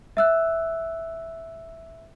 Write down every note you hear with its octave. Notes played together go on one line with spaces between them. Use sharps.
E5 E6 F#6